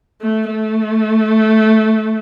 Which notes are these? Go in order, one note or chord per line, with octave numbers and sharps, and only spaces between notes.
A3
A3